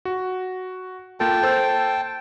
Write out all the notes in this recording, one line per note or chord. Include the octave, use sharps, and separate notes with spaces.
F#4
A#3 F4 A4 G5 A5
A4 C5 E6